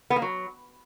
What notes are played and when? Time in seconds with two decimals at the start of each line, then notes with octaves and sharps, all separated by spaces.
0.10 B3
0.16 A#3
0.22 F#3